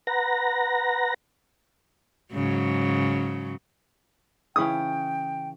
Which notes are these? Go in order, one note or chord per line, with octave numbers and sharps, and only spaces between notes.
B4 F#5 A#5 A#6
G#2 C#3 F#3
C#3 E3 C#4 G5 D#6